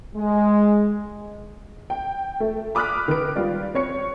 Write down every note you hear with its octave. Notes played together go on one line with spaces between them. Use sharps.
G#3
G5
A3
B5 D6 D#6 F6 F#6 B6
D#3 B4 D7
G3 F4 D5
C4 C#5 C#7